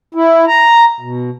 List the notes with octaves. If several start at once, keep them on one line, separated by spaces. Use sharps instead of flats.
E4
A#5
B2